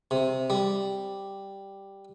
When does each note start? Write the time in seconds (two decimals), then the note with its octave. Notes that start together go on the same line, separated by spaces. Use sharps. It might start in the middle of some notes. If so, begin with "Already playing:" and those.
0.11 C3
0.50 G3